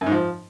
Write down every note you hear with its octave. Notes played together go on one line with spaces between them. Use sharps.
F#2
G#2
F3